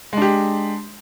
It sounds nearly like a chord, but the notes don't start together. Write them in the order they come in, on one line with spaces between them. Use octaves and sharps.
G#3 D4 G4